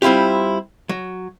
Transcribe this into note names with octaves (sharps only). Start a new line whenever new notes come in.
G3 C4 E4 F4 G4
F#3